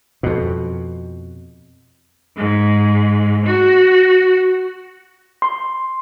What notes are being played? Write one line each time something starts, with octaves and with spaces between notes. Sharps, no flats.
F2 B2
G#2
F#4
C6